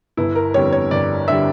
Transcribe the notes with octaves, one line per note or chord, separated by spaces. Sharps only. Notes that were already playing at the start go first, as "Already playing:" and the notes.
G1 E4
A#4
F2 D3 G3 C#5
C#5
G1 D5
D3 G3 E5